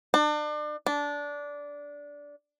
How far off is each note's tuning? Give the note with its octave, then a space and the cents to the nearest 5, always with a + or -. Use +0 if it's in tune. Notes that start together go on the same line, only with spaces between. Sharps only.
D4 +35
D4 -15